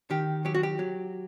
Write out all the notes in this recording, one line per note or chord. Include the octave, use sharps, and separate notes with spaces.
D#3 G4
F#3 G4
F#4
G4
F#3